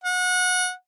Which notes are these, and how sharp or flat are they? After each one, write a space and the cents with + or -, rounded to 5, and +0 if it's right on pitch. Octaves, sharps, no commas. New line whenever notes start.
F#5 -25